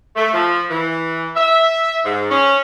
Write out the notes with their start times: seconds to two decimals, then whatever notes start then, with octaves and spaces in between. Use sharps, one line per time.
0.16 A3
0.33 F3
0.70 E3
1.36 E5
2.05 G#2
2.31 C#4